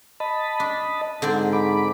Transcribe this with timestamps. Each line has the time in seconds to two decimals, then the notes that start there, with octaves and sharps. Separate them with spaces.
0.20 D#5 A5 B5
0.60 D4
1.22 G#2 D3 C4 D5
1.53 B5 D6